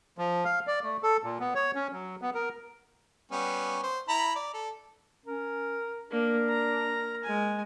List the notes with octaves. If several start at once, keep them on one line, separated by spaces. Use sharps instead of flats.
F3
F5
D5
A3
A4
A#2
B3
C#5
C#4
F#3
B3
A#4
G3 B3 C#4
C5
E4 A#5 B5
D5
A4
C#4 A#4
A#3 D4 A#4
A#5
G#3 G#5